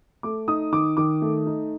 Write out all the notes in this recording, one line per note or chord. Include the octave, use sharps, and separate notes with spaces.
A3 D6
D#4 D#6
D#3 D6
D#3 D6
A3
D#4